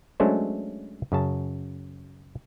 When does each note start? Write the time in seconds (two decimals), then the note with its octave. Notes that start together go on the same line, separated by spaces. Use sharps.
0.20 F#3 G#3 A3 C#4 D4 C5
1.12 F#2 C#3 A5